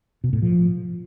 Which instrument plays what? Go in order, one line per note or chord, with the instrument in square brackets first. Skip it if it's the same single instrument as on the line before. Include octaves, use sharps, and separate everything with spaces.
[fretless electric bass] B2
A2
F3